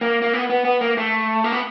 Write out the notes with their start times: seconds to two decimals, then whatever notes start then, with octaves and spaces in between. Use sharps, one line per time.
0.01 A#3
0.22 A#3
0.33 B3
0.50 B3
0.65 B3
0.81 A#3
0.97 A3
1.44 A#3
1.52 B3